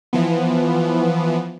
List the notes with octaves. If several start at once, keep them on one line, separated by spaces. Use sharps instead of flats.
E3 F3 B3